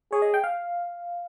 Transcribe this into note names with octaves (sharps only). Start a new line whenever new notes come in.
G#4 C#5
D#5
G5
F5